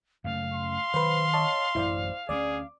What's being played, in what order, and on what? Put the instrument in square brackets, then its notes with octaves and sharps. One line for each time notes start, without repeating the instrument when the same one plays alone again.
[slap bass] F#2 C#3 A3 [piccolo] F5
[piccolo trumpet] C6
[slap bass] D#3 F#3 [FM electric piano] B4 C5
[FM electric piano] C#5 D#5 A5
[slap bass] A1 F#2 [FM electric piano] E4 C5 D5
[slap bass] D2 A3 C#4 [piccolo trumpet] G#4 [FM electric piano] D5 D6